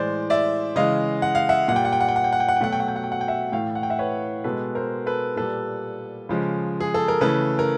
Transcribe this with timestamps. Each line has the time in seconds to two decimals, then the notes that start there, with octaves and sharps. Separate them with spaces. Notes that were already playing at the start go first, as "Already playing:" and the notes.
Already playing: A2 E3 G#3 C5 D5
0.30 D5 E5
0.76 C#3 E3 G#3 D#5 F5
1.22 F#5
1.35 F5
1.49 E5 F#5
1.68 A#2 F#5
1.72 G3 G5
1.85 F#5
1.92 G5
2.01 F#5
2.08 G5
2.16 F#5
2.24 G5
2.33 F#5
2.40 G5
2.49 F#5
2.57 G5
2.60 B2 F#3 A3 F#5
2.72 G5
2.80 F#5
2.88 G5
2.96 F#5
3.04 G5
3.12 F#5
3.21 G5
3.28 E5 F#5
3.52 A2 E3 A3 F5 G5
3.75 F#5
3.83 G5
3.90 E5 F#5
3.99 B4 C#5
4.44 B2 G#3 A4 B4
4.75 A#4 C5
5.06 A4 B4
5.36 A#2 G3 A4 B4
6.29 C#3 F3 G#3
6.80 G#4
6.94 A4
7.08 A#4
7.21 C#3 E3 A3 A4 B4
7.59 A#4